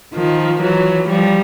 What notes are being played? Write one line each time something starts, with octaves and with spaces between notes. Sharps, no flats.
D#3 F3
E3 F#3
F3 G3